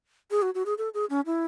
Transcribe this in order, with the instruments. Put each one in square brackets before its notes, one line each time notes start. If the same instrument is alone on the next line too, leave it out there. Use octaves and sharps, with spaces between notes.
[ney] G#4
F#4
F#4
G#4
A4
G#4
C#4
E4